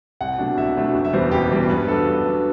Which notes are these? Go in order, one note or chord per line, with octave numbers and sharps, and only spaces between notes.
C2 F#5
B2 F#3 A3 D4
C2 E5
B2 F#3 A3 D4
F#1
E5
E2 B2 G3 B3 C5
F#1 G4
E2 B2 G3 B3
G2 B4
F#3 B3 D4 A4
G2
F#3 B3 D4